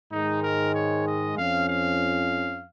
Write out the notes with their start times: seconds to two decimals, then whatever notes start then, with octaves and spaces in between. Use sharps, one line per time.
0.12 G#2 D#3 G#3 D#4
0.43 A#4
0.75 C#5
1.06 D#5
1.37 F2 F3 C#4 F5
1.69 F5